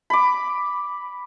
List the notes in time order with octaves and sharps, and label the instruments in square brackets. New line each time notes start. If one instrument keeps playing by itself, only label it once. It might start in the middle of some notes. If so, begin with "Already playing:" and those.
[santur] B5 D6